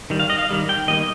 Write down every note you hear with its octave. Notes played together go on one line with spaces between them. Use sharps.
D#3 G3
F5
D#5
F5
D#3 G3
G5
D#3 G3 A#3 D#5